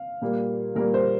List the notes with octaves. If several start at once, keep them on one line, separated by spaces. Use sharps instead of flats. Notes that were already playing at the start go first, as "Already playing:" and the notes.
Already playing: F5
A#2 G3 A#3
A#2 G3 A#3 A#4
C5